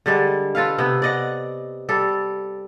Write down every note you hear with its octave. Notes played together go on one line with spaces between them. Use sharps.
D3 G3 G#3
F4 A4 B4 F5
C3 B3
D5 D#5 F#5
G3 A4